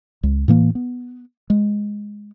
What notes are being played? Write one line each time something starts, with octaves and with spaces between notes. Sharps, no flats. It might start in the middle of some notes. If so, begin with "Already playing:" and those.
C#2
A2 E3 A#3
B3
G#3